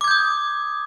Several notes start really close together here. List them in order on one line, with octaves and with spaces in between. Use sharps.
D6 G#6 G6 D#6